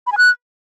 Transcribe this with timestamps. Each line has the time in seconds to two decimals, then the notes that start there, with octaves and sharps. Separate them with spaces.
0.07 B5
0.12 G#5
0.18 F#6